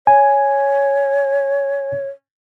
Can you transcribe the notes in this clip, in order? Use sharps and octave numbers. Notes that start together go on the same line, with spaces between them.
C#5 G#5